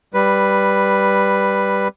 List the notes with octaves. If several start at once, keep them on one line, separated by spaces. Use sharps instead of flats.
G3 B4